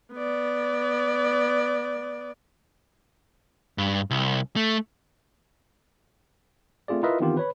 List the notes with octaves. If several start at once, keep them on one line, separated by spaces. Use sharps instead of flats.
B3 D5
G2
C2
A3
A3 C4 F4 G#4 D5
E4 F4 A#4 B4 D#5 E5
D#3 E3 B3 C4 F4 G4
B4 C#5 B5